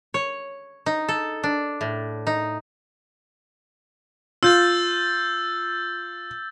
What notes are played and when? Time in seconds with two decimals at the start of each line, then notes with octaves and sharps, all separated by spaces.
0.14 C#5
0.86 D#4
1.08 A4
1.44 D4
1.81 A2
2.27 D#4
4.43 F4 E6 G6 A6